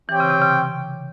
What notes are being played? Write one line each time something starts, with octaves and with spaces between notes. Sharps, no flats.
E3 C4 G4 C#5 G5
C#3
C3
C#3